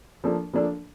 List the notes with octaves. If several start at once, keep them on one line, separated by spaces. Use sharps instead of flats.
F3 A#3 D4 A4
F3 A#3 D4 A4